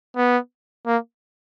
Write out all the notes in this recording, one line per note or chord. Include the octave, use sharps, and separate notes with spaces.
B3
A#3